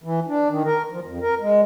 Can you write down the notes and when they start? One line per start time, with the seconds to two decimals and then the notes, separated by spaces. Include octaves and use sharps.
0.04 E3
0.28 D4
0.49 D#3
0.65 A#4
0.90 F3
1.05 F2
1.21 A#4
1.40 G#3